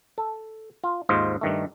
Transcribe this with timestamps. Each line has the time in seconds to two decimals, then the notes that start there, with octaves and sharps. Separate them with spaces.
0.18 A4
0.84 F4
1.09 D#2 G#2 F4 C5 D#5
1.41 G2 D#3 A3